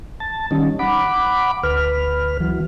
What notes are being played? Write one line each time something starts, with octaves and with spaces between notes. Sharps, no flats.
A5
D#3 G3 C#4 D#4
F#5 B5 D6
D2 B4 F6
E3 F#3